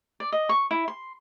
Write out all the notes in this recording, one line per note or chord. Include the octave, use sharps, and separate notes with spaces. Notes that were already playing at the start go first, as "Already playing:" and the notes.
D5
D#5
C#6
E4
C6